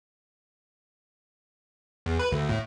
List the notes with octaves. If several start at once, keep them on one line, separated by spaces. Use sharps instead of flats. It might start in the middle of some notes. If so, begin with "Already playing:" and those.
E2
B4
D2
A2